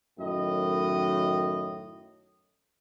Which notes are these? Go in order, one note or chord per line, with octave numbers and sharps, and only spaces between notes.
F#2 A2 D#3 D#5